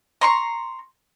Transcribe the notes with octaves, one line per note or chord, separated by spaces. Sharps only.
A#5 C6 C#6